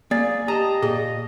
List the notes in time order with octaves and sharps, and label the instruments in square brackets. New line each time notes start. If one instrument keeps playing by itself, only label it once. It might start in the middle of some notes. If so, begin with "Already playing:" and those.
[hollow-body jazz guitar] A#3 [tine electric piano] G#4 [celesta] D5 A6
[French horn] G4 [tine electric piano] D#5 A5 D#6 [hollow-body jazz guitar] A#5
[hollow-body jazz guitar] A#2 [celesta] G#4 [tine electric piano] D#5